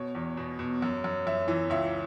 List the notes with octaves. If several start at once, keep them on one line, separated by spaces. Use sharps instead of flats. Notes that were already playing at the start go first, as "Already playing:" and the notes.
Already playing: B2 C#5
E2
B2
B2
F#2
F#2
F#2 E5
E3
C#2 E5